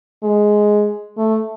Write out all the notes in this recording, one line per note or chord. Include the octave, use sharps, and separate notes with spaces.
G#3
A3